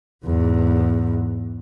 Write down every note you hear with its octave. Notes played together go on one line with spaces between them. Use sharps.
E2 G#2